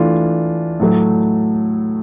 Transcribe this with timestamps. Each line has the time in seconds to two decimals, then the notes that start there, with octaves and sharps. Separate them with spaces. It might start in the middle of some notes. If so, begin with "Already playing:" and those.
Already playing: E3 A3 D4 F4
0.80 A2 F#3 A3